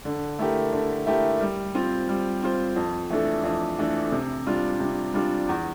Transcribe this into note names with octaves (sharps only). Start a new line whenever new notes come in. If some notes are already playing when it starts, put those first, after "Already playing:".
D3
A3 E4 G4 A#4
D3
A3 E4 G4 A#4
G3
C4 F4 C5
G3
C4 F4 C5
F2
E3 A3 D4 A4
F2
E3 A3 D4 A4
C3
G3 D4 F4
C3
G3 D4 F4
E2